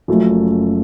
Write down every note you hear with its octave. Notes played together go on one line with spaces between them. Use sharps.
F#1 F#2 F3 A3